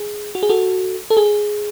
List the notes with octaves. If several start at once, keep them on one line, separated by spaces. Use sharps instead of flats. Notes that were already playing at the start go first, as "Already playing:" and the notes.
Already playing: G#4
F#4
G#4
F#4 A4
A4
G#4